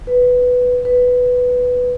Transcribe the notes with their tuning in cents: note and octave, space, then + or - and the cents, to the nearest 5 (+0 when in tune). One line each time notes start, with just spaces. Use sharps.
B4 +5
B4 +5